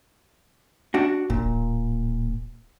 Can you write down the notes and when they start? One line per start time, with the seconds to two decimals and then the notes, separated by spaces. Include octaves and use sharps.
0.94 D4 F#4
1.30 E1 A#2
1.45 D1